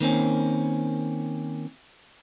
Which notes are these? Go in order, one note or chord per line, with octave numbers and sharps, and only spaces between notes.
D#3 A#3 C4 C#4